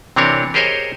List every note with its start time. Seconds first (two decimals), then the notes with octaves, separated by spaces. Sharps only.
0.16 C3 E3 C4 D4 A#4 C#5
0.54 G4 G#4 A#4 C5 C#5 D#5